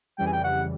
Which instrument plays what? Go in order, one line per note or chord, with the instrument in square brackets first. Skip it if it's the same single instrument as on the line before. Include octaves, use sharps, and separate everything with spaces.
[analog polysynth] F2 C#3 E3 G3 [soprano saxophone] G5
[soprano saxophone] G#5
G5
F#5